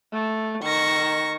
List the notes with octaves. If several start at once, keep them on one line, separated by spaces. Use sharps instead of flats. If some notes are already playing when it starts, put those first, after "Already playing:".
A3
D#3 C#6 A#6